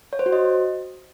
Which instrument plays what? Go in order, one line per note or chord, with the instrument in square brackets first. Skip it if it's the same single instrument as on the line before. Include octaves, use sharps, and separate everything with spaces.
[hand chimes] C#5
C5
F#4
D#5